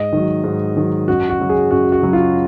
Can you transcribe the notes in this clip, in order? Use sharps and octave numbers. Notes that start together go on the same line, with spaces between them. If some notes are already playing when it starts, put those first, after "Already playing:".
Already playing: G#2 D#5
D#3 F#3
G#2
D#3 F#3
F#2 F#4
F#4
C#3 F#3
G#4
F#2 F#4
F#4
C#3 F#3
F4